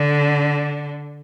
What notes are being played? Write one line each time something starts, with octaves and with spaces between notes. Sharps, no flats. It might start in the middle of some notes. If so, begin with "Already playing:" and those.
Already playing: D3